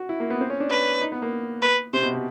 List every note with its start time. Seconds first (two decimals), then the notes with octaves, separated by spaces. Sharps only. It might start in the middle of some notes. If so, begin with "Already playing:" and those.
Already playing: F#4
0.09 E4
0.20 A#3
0.30 B3
0.41 C4
0.50 C#4
0.60 D4
0.70 B4
1.01 D#4
1.12 B3
1.22 A#3
1.62 B4
1.93 C3 C5
2.03 B2
2.14 B2